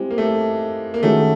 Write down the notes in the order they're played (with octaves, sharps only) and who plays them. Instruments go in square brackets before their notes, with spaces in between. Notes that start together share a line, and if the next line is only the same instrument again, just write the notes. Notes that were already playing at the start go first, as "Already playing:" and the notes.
Already playing: [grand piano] G3 C4 E4 G4 [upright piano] G#3
[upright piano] A#3
A3
A#3
[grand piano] D#3 G#3 C#4 F#4 [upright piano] A3